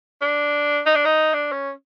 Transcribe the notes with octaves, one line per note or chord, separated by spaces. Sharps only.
D4
D#4
D4
D#4
D4
C#4